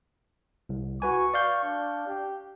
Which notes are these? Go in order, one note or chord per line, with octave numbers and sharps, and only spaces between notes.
C2
F#4 B4 G#5 C#6
D5 F5 G6
D4
G4